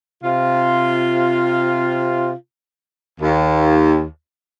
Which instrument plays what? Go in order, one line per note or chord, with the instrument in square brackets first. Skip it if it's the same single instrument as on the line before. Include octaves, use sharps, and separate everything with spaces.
[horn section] C3 F4
[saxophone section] D#2